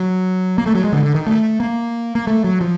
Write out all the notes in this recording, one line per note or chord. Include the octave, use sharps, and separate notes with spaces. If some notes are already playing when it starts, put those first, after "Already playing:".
Already playing: F#3
A#3
A3
F#3
G#3
D3
D3
D#3
A3
A#3
A#3
A3
F#3
F3